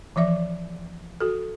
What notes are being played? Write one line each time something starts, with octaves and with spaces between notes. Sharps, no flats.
E3 F3 D5 E5
F#4 A4